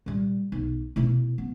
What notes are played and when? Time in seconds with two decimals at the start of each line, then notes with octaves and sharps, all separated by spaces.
0.06 A#2 G3
0.52 B1
0.96 B2 E4
1.38 B3